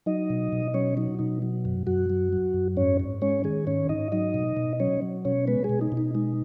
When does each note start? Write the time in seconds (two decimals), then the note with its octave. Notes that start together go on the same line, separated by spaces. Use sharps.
0.06 F#3 D#4 D#5
0.30 B2
0.53 B2
0.74 F#3 C#4 C#5
0.97 F#3 D#4
1.19 B2 D#4
1.42 F#3
1.65 F#2
1.87 F#2 F#3 F#4
2.10 F#3
2.33 F#3
2.54 F#2
2.77 G#2 C#4 C#5
3.00 G#2
3.22 G#3 C#4 C#5
3.44 D#3 G#3 G#4
3.67 G#2 C#4 C#5
3.89 G#2 D#4 D#5
4.12 F#3 D#4 D#5
4.34 B2
4.57 B2
4.80 F#3 C#4 C#5
5.02 F#3
5.25 B2 C#4 C#5
5.47 G#3 B3 B4
5.64 G#3 G#4
5.69 B2
5.81 D#4
5.92 B2
5.97 D#4
6.15 G#3 D#4